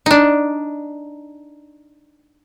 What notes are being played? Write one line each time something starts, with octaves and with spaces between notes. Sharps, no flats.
D4 D#4